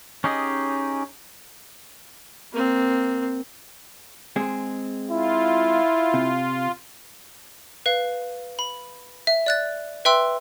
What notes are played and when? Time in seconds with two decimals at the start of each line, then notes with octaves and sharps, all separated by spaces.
0.24 C#4 D#4 G4 G#4 D#5
2.53 A#3 C4
4.36 G#3 C4 G#4
5.11 E4 F4
6.14 C3
7.86 B4 F5
8.59 B5
9.27 E5
9.46 D5 F#6 A6
10.05 B4 E5 G5 C6 E6